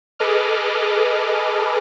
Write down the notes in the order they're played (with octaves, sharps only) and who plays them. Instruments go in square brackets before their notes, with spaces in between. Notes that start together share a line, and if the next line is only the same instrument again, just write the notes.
[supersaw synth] G#4 A4 B4 D#5 D6 F6